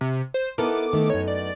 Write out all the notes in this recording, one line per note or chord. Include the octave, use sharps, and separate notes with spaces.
C3
C5
B3 D#4 E4 A4 A#4 D6
D#3 A3
F#2 D#4 C#5
D5